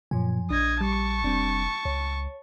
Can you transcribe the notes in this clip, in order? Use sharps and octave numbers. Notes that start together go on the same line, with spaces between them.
F#2 A#2 F3 G#5
A#1 D4 D#5 G#6
G3 A5 C#6
F1 G3 C4 D4
C#2 C#5